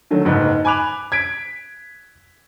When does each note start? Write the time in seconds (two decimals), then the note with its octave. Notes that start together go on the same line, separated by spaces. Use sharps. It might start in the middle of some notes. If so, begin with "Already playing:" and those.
0.11 D3 D#3 F#3 A3
0.25 F#1 G#2 D#4 B4
0.65 G#5 B5 D6 F#6 F7
1.12 G#6 B6 D7